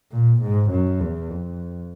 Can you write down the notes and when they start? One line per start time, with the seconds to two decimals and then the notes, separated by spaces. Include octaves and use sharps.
0.12 A#2
0.42 G#2
0.70 F#2
1.00 E2
1.29 F2